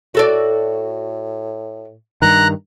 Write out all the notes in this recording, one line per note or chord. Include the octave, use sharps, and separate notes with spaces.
A2 F#4 A4 D5
G2 D#3 A#5 F#6